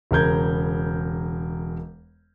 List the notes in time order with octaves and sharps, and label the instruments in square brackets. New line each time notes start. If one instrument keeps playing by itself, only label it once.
[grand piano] E1 C#3 A#4 G6 G#6